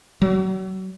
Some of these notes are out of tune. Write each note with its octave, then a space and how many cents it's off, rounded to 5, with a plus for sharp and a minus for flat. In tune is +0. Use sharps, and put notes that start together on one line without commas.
F#3 +30